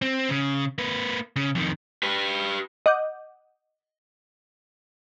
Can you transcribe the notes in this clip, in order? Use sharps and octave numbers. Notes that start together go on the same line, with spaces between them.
C4
C#3
A#3 B4
C#3
F2 D#3
G4 B4
D#5 F#5 D6 G6